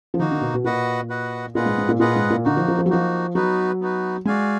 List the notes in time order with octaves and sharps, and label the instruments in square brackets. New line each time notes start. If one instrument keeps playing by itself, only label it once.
[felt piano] F3
[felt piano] D#3 [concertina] A#3 D#4 F#4
[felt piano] D3
B2
B2
[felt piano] A#2 [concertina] F#4 B4 D#5 F#5
[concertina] F#4 B4 D#5 F#5
[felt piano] A#2 [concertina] F4 G#4 B4 D#5 F#5
[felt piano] G#2
G#2
A#2
[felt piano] A#2 [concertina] F4 G#4 B4 D#5 F#5
[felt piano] G#2
A#2
[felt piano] D3 [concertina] A#3 D#4 F#4
[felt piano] F3
F3
F3
F#3
[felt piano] F3 [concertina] A#3 D#4 F#4
[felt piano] F#3 [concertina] B3 D#4 F#4 B4
[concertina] B3 D#4 F#4 B4
[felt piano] G#3 [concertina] F#4 D5 F5 G#5